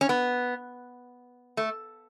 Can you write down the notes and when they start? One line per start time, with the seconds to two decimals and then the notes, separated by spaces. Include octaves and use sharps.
0.01 C#4
0.09 B3
1.57 A3